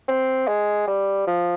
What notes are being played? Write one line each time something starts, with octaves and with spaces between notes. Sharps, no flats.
C4
G#3
G3
F3